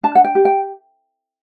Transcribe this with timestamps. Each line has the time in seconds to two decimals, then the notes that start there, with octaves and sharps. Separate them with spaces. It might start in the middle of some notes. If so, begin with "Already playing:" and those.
0.03 D4 A5
0.15 F#5
0.24 G5
0.35 G4
0.45 G5